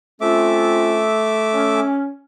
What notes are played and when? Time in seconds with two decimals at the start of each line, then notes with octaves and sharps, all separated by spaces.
0.21 A3 C4 C#4 F4 E5 D6
1.53 C#4